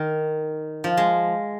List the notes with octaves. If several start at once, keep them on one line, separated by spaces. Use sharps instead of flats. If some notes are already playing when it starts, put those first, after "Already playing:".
Already playing: D#3
F3
G#3